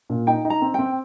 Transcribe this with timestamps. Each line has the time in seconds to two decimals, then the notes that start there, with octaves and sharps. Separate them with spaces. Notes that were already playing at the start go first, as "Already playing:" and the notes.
0.10 A#2
0.27 D#4 G5
0.45 D#4
0.50 A#5
0.62 C4
0.74 C4 G5